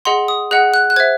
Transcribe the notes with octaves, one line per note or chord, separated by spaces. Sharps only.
G#4 D#5 F#5 C6
D#6
G#4 D#5 F#5 F#6
F#6
F#6
C5 E5 G#6